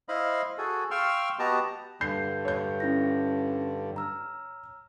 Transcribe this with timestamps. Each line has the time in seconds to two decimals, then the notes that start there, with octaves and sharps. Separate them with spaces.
0.09 E4 C5 D#5 F5 B5
0.58 F#4 G#4 A4
0.91 F5 G5 C6 C#6 E6 F6
1.39 B3 F#4 G4 D#5 A5 A#5
2.01 G2 D3 G6 C7
2.45 C#5 G6
2.80 C#4 E4 A#6
3.96 A#5 E6 F6